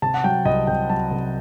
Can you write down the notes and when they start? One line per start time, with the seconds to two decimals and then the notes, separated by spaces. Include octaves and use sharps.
0.02 C3 A5
0.14 F#5
0.24 F#3 G5
0.45 C2 D#5
0.67 C3 G5
0.89 F#3 A5
1.11 C3